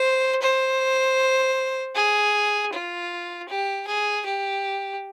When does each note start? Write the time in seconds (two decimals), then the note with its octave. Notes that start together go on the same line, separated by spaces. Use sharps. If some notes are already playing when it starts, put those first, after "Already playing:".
Already playing: C5
0.42 C5
1.95 G#4
2.72 F4
3.49 G4
3.87 G#4
4.26 G4